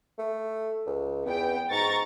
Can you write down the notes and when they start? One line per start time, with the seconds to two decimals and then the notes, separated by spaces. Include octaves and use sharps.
0.18 A3
0.86 C#2
1.26 E2 B3 G5
1.71 G#2 A#5 C#6 A6